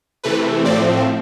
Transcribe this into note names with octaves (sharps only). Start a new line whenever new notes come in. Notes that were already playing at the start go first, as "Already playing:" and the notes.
C3 E3 A3 B4
A2 F3 A3 C4 D5